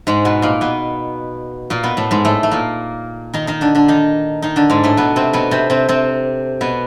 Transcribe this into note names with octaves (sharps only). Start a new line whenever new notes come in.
G#2 G#3
B2 B3
A#2 A#3
B2 B3
A#2 A#3
B2 B3
A2 A3
G#2 G#3
A2 A3
A3
A#2 A#3
D#3 D#4
D#3 D#4
D3 D4
D3 D4
D#3 D#4
D#3 D#4
D3 D4
G#2 G#3
A2 A3
B2 B3
C3 C4
B2 B3
C3 C4
C3 C4
C3 C4
B2 B3